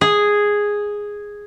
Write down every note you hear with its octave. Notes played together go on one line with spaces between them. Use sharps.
G#4